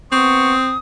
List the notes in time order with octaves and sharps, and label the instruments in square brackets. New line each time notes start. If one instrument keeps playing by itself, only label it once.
[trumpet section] B3 C#6 [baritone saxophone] C4 [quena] D#6